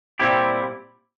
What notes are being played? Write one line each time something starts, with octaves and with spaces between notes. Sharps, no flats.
A#2 G3 C4 E4 G4